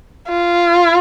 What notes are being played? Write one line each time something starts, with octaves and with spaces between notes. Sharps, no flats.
F4